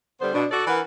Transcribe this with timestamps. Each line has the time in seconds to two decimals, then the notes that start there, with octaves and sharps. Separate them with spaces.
0.20 D3 G3 B3 C5
0.34 B2 D4
0.51 F#4 A4 D5
0.67 E3 A#4 B4 F#5